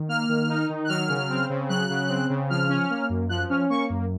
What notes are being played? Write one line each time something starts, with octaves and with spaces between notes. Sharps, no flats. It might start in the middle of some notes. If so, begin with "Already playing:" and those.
Already playing: D#3
A#3 F6
D#3
D#4
D#3
F#6
F#3 F6
C#3
C4
C#3
F#3 F#6
C#3
C4
C#3
F3 F6
C#4
A#3
F#2
F3 F#6
C#4 F6
A#3 C#6
F#2